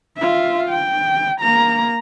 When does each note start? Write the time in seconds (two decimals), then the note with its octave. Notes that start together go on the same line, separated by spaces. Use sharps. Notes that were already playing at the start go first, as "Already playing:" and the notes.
0.17 F4 E5
0.70 G5
1.41 A#3 A#5